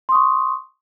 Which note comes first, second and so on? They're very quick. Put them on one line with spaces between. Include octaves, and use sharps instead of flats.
C6 D#6 C#6